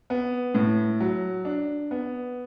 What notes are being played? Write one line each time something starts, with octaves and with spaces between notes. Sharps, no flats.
B3
A2
F#3
D4
B3